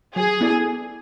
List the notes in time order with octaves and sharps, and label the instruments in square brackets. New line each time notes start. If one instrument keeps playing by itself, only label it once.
[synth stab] F#3 [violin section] G#4
[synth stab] B3 E4 A4 D5